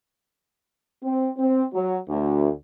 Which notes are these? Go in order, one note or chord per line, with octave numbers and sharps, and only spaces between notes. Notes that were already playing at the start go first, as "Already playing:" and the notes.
C4
C4
F#3
D2